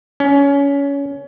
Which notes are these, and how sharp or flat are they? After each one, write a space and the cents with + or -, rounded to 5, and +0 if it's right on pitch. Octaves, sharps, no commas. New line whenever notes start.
C#4 +20